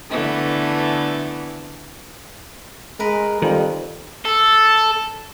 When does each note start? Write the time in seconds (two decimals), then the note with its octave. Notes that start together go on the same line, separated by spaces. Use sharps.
0.10 D3 E3 A3 B3
3.00 G#3 A#4 B4
3.42 F2 D#3 G3
4.25 A4